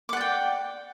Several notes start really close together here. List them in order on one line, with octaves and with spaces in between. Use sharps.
D6 F#5 D5 G5